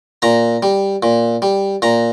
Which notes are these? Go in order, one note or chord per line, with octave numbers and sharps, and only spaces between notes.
A#2 A#5
G3
A#2
G3
A#2 A#5